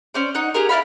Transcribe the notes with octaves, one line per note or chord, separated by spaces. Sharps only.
C#4 C5 D5
D#4 F#5
G4 G#4 A#4
E4 D5 F5 B5